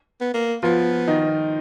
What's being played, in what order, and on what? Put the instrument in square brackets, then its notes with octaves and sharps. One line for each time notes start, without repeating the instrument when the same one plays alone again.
[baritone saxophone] B3
A#3
[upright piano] F3 F4 [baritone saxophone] B3
[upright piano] D#3 D#4